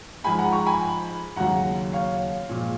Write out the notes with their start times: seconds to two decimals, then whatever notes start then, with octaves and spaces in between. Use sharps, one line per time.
0.24 G#2 F3 G#3 G#5 B5
0.38 F#5 A#5
0.52 A#5 C#6
0.66 G#5 B5
1.36 D#2 C#3 F#3 F#5 A#5
1.93 C#5 F5
2.49 A#2 F3 G#3